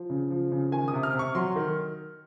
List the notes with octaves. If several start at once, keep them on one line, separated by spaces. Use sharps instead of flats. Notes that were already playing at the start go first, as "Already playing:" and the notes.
Already playing: F3
C#3
F3
C#3
D#3 G#5
D#6
C3
F6
C3 C#6
F#3 C6
D#3